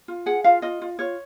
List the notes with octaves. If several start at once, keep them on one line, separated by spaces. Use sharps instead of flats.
F4
G#4 F#5
F4 F5
F4 D#5
F4
F4 C#5